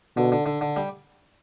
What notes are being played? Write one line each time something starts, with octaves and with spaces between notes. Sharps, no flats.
B2 D3
D3
D3
D3
G3